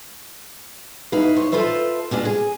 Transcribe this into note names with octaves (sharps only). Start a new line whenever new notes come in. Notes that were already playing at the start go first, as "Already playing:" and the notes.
D#4 E4 B4 F5
C5 C#5
F4 A4 B4 C5 E5
G3 G#3 D4 F4
G#4